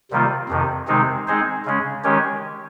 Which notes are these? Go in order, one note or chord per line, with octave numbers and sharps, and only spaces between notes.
C3 D#3 G3 A#3 F4
F2 C3 D#3
C3 D#3 G#3 C4 D#4
G#3 C4 D#4 G#4 C5
C#3 G#3 C#4
D#3 G#3 C#4 G4 C#5